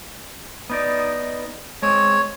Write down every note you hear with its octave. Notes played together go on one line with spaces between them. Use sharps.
B3 D#4 D5
G#3 C4 C#5